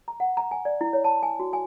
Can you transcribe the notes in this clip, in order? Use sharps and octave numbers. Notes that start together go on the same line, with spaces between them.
A#5
F#5
A#5
G#5
D5
E4
C#5
A5
G#5
F#4
G#5